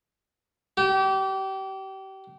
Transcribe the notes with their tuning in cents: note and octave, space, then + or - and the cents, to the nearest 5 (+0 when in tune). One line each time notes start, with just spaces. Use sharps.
G4 -30